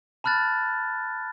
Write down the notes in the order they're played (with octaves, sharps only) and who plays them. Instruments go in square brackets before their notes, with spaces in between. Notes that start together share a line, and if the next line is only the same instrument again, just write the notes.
[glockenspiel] A5 B5 F6 F#6 A6